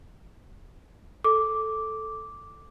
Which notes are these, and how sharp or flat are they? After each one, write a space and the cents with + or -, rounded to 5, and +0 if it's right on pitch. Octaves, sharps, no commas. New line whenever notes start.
A4 +0 D6 -5